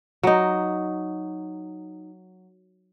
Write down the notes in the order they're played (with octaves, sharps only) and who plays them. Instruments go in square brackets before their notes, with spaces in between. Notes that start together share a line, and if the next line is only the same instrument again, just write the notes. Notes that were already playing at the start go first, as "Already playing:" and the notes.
[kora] F#3 D#4